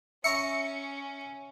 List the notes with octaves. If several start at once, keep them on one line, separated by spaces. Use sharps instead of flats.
C#4 E5 A#5 C#6 C#7